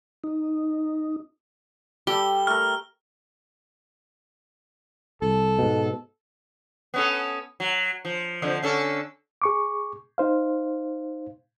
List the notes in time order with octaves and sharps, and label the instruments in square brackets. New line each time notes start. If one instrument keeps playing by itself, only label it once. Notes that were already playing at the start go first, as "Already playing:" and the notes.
[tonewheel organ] D#4
[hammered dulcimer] G3 A4 [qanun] G4 [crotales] G7
[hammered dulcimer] A3 A#4 [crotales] F6
[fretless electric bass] C2 [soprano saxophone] A4
[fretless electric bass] G#2 B2
[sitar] B3 C#4 A4
F#3
F3
F2 D3 F3
D3 C#4 A4
[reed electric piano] G#4 C#6 D6
D#4 C5 F5